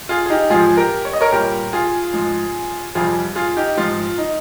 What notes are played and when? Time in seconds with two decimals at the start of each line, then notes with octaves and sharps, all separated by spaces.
0.09 F4 G#4
0.26 G#4
0.30 D#4 G4
0.50 G#2 F3 F4 G#4
0.77 G4 A#4
1.05 C#5
1.13 D#5
1.21 A#4 C#5
1.32 A#2 G3 G4 A#4
1.73 F4 G#4
2.14 G#2 F3
2.95 F2 C3 G3 F4 G#4
3.36 F4 G#4
3.57 D#4 G4
3.77 G#2 F3 F4
4.18 D#4